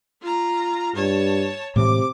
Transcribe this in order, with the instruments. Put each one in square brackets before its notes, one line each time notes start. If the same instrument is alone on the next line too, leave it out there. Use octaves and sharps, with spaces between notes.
[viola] F4 A#5
[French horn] G2 [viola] C#5 A5
[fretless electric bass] A2 E3 G#3 [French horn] C3 [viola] D6